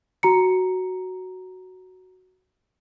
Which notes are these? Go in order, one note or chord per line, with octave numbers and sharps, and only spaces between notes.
F#4 A#5 C#7